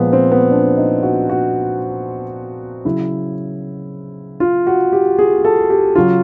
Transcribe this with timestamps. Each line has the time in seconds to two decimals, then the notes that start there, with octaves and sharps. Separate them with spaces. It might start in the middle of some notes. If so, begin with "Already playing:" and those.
Already playing: A#2 F3 G#3 B3
0.13 C4
0.32 B3
0.51 D4
0.77 D#4
1.03 F#4
1.29 F#4
2.85 C#3 F#3 E4
4.40 F4
4.67 F#4
4.93 G4
5.19 G#4
5.45 A4
5.70 G4
5.96 C#3 F#3 F4